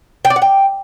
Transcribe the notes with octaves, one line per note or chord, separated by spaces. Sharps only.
G5
D5
F#5
G5